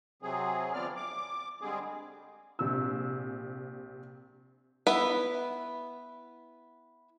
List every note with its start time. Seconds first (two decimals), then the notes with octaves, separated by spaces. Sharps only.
0.22 C3 F#3 C4 G#4
0.73 D2 F3 B3 C4 D5 F6
0.96 D6
1.61 D3 G3 G#3 C4 G#4
2.59 A#1 C3 E6
4.87 B3 E4 B4 E5